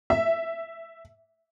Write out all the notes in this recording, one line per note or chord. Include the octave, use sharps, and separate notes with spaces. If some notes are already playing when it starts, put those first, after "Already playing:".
E5